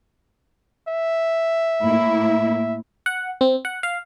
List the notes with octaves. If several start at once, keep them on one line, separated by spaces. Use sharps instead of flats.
E5
A2 A#3 E4
F#5
C4
F#5
F5